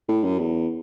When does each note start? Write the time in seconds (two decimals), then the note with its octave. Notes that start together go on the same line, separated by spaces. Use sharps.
0.09 A2
0.24 F#2
0.39 E2